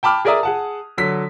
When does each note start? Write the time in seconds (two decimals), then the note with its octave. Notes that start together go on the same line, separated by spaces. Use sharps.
0.03 G5 A5 B5 D6 F6
0.25 G#4 A#4 D5 E5 D#6
0.43 G#4 F#5 A5
0.98 D3 F#3 B6